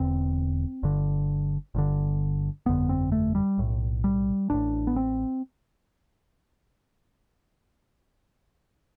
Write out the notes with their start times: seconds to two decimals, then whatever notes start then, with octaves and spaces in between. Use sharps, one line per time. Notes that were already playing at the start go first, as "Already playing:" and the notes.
Already playing: E1 E2 D3 C4
0.83 G1 G2 D3
1.75 G1 G2 D3
2.66 G1 F2 D3 B3
2.89 C4
3.12 A3
3.35 G3
3.58 B1 A2
4.04 G3
4.50 A1 A2 D4
4.87 B3
4.96 C4